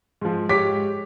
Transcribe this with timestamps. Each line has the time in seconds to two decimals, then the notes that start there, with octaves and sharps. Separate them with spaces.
0.21 G#2 F3
0.49 G#2 G4 C#5 D6 B6